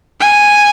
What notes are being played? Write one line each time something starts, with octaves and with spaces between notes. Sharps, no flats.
G#5